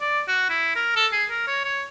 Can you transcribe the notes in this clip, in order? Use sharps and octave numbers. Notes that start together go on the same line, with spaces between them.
D5
F#4
E4
A#4
A4
G#4
A#4
C#5
C#5